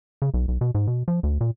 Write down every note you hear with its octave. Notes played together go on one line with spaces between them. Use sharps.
C#3
B1
B1
B2
G#2
B2
F3
D2
A#2